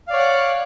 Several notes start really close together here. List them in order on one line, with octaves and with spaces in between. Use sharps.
F5 D5 C#5 F#5 D6